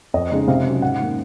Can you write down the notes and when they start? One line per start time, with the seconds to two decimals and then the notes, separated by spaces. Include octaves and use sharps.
0.14 F2 D#5
0.32 C#3 G#3 D#4
0.47 C3 F5
0.65 F#3 C#4
0.82 G#2 F#5
1.00 D#3 A#3 C#4